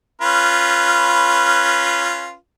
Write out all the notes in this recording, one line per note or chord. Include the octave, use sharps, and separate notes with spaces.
C#4 F4 B4